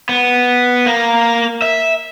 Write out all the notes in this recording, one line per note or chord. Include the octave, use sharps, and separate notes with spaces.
B3
A#3
E5